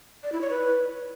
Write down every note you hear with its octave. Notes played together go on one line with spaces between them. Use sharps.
D5
E4
C#5
B4